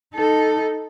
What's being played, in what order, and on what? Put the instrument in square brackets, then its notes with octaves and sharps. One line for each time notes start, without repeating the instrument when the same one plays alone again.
[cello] D#4 A4